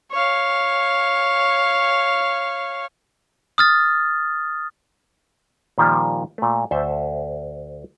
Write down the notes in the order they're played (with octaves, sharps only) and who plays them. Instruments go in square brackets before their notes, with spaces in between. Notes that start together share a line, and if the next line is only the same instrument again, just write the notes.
[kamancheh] C#5 F5
[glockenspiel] D#6 F6 A6
[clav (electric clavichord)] A#2 D#3 F3 G3 A#3
A#2 A3
D2 A4 C5 E5